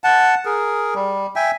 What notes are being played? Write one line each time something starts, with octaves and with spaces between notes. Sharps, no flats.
F#5 A5
G#4 A#4
G3
E5 G5 G#5